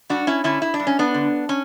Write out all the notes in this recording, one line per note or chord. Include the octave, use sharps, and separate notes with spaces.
G2 D4 F#4
C#4 E4
D3 C#4 E4
E4
D4
G2
C#4
B3 D4
D3
C#4